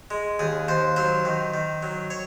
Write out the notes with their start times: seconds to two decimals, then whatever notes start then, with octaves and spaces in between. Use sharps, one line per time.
0.11 G#3
0.39 D#2 G#4
0.68 D#2 C5
0.96 F#3 C5
1.25 D#3
1.54 D#3
1.83 F#3
2.10 C#5